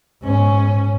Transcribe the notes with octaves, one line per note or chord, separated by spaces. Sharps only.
G#2 C#4